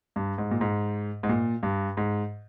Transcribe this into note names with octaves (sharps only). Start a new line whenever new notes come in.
G2
G#2
A#2
G#2
G#2
A#2
G2
G#2